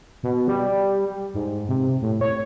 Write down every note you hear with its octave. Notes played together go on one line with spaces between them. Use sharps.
B2
G3
G#2
C3
A2
C#5